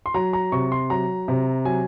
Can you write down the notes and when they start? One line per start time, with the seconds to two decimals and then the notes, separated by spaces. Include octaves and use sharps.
0.06 C6
0.14 F#3 A#5
0.33 A#5
0.52 C3 C#6
0.72 C6
0.90 F#3 A#5
1.28 C3
1.65 F#3 G#5